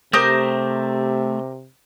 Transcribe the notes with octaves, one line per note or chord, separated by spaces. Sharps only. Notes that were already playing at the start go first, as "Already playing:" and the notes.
C3 A3 G4 A#4 C5 D#6 G6